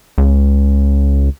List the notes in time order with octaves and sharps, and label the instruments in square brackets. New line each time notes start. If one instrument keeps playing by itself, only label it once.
[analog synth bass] C#2